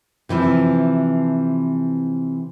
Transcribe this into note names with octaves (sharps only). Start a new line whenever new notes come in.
C3 E3 F3